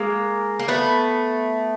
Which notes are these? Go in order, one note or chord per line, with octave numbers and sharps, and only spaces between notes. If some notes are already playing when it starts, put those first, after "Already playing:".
Already playing: G#3 A#3
A#3
A3 B3